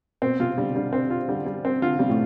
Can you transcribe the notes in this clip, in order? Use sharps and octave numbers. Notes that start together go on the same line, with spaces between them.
B2 C4
C3 F4
D3 G3
D3 G3
C4
F4
D3 G3
G3
C4
D3 F4
C3 G3
A2